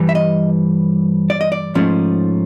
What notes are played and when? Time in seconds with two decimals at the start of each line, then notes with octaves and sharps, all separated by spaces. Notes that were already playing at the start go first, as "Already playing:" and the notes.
Already playing: G2 E3 G3
0.09 E5
0.15 D#5
1.30 D5
1.41 D#5
1.52 D5
1.75 G#2 F3 A3 C#4